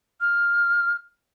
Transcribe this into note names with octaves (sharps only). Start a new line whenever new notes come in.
F6